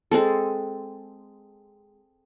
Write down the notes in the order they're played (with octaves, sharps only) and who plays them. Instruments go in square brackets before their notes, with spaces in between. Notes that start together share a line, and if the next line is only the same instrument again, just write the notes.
[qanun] G#3 C4 A4